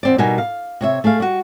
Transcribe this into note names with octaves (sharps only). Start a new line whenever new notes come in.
E2 C4 D5
B2 G3 D#4 A#4 G#5
F5
C3 C#5 E5
A3 G#4 D5 F5
G3 F#4